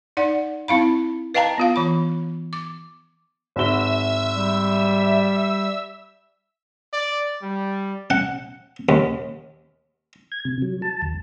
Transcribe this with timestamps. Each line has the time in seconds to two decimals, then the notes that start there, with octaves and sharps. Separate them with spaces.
0.17 D#4 D5 F#5
0.68 C4 E4 F5 B5
1.34 B4 D#5 F5 G5 A5 A#5
1.58 B3 F4 F5
1.76 E3 B5
2.53 D6
3.56 G#1 F#4 E5 E6 G7
4.33 G3
6.93 D5
7.42 G3
8.10 F#5
8.89 D#2
10.32 G#6
10.45 C3
10.62 F#3
10.82 A5
11.02 D#2